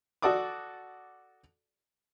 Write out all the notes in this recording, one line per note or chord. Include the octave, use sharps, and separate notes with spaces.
F#4 A4 D5 D6 D#6